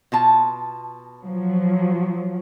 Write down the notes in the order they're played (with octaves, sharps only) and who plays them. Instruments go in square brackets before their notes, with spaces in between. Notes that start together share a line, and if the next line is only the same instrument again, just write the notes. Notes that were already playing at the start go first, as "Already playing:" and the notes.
[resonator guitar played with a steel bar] B2 F4 A5
[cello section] F3 F#3